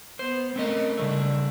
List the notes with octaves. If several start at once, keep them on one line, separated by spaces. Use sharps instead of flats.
B3 C5
A3 C4 C#4 A#4 D#5
C#3 G3 A3 D4